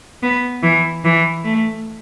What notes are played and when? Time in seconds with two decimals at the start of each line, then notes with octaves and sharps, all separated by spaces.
0.23 B3
0.63 E3
1.04 E3
1.44 A3